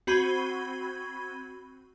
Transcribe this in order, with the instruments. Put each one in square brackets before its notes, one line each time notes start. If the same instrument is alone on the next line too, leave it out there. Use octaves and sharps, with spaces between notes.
[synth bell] C4 F#4 B5 G#6 D#7 G7